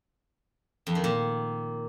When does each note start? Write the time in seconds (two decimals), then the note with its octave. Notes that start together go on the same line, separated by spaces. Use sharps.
0.87 F2
0.95 D#3
1.04 A#2